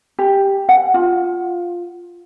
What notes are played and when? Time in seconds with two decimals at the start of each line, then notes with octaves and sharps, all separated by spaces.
0.19 G4
0.69 F#5
0.94 F4